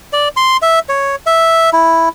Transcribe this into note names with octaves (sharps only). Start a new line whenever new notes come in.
D5
C6
E5
C#5
E5
E4